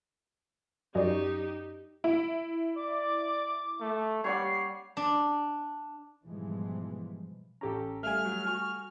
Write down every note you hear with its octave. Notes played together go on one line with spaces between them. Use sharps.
F#2 D#4 F#4 G4 D5 D#5
E4
D5 D6
A3
G3 C#5 D5 F#5 C7
D4
G#2 B2 E3 F3 G3 G#3
A1 C#4 G4 A4 A#5
G3 A3 E5 F5 G#5 F6
F#3
F#4 G#5 C#6